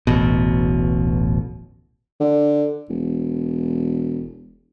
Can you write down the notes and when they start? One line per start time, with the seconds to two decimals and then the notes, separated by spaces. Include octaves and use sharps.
0.07 D1 A1 B2
2.20 D3
2.89 E1